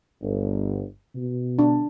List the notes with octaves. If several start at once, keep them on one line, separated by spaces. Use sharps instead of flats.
G1
B2
D4